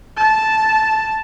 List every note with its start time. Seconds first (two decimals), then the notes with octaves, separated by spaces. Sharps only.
0.17 A5